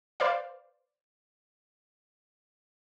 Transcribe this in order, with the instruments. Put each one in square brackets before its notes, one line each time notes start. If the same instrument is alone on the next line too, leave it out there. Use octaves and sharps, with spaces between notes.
[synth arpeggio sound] B4 C5 D5 F5